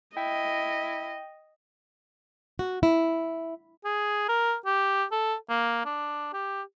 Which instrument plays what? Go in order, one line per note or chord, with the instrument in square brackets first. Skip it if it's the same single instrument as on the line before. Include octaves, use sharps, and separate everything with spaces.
[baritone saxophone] E4 [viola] D#5 [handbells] G5
[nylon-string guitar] F#4
E4
[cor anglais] G#4
A#4
G4
A4
A#3
D4
G4